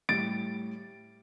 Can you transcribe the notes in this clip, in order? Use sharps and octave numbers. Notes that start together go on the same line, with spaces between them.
A2 G3 A6 D7